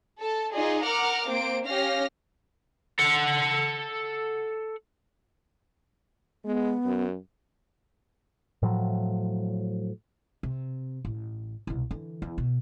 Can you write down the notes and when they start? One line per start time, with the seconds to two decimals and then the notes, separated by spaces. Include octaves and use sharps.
0.21 A4 A5
0.53 D#4 F4 G#4 D5 D#5
0.83 A#4 F#5 A#5 D6 F6
1.29 A#3 C4 C5 D7
1.67 C#4 G4 F5 F6 A#6
2.99 A4 F#5
6.45 G#3 B3
6.85 F#2
8.62 A2 F3 F#3
10.43 C3
11.05 A1
11.67 C2 B2
11.91 D3 E3
12.22 E2
12.38 B2